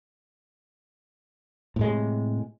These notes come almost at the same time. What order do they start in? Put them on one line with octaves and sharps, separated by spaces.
A2 G#3 C3